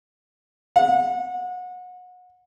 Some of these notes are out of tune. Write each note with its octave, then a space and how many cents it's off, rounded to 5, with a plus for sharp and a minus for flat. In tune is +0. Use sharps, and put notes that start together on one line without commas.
F#5 -30